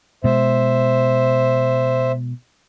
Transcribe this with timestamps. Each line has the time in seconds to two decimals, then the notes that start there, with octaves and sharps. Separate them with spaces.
0.24 B2 G#3 C5 E5